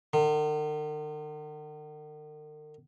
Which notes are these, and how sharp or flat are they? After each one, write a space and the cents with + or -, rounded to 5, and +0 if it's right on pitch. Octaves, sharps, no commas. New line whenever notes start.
D#3 -45